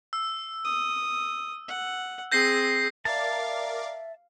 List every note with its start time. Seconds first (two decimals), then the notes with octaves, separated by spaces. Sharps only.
0.13 E6
0.65 D#6
1.68 F#5
2.32 C4 G#4 G6 A#6 C7
3.05 A#4 D5 E5 F5 A5